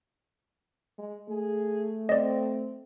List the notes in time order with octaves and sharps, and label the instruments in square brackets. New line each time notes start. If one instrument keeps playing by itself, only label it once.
[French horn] G#3
[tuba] A3 [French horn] G#4
[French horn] C4 [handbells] D5 D#5